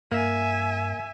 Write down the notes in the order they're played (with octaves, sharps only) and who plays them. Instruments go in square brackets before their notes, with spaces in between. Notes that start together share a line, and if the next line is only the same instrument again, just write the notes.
[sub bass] G2 [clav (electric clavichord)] A#3 [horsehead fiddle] E5 G#5